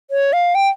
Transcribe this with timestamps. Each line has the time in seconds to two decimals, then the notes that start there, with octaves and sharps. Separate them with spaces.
0.11 C#5
0.33 F5
0.55 G5